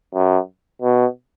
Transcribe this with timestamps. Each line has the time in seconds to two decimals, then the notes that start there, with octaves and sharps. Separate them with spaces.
0.15 F#2
0.82 B2